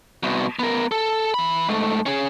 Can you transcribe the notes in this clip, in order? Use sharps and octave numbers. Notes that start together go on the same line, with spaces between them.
C2 B2
B3 A#4
A4
E3 B5
G#2 A3
C#4 G#4